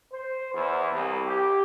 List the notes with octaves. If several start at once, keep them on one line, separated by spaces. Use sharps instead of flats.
C5
E2
C2
G4